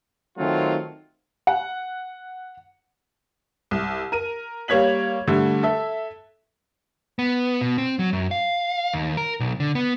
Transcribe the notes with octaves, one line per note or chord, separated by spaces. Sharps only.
D#3 F#3 A3 C4 F4
F#5
C2
A#4 D#7
G3 A#3 C#5 G#6 B6 F#7
D3 G3 A3
A4 E5
B3
B2
C4
F#3
F#2
F5
D#2
A#4
B1
D3
B3